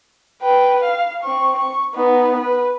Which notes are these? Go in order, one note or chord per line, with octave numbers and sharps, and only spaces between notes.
B4 G5
F5
C4 C#6
C#6
B3 D#4
B4